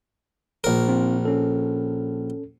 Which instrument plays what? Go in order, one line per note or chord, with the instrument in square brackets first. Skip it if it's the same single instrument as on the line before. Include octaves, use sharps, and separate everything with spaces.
[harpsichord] A#1 A#4
[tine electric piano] C4 F4
C#4 A4